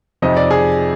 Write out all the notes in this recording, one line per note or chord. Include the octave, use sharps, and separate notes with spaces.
F2 C3 F3 C4 D#4 D#5
D5
G#4